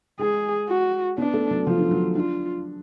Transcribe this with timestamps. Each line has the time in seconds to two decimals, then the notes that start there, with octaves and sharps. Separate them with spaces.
0.19 G#3 G#4
0.69 F#4
1.18 B3 D4
1.34 A3
1.51 F#3
1.67 F3 F4
1.79 D3
1.91 F#3
2.15 D4 F4